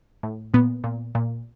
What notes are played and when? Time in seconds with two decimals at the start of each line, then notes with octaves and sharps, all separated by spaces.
0.23 A2
0.54 A#2 B3
0.84 A#2
1.15 A#2